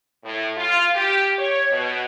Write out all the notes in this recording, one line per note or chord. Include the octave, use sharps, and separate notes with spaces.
A2
F4
G4
C#5
B2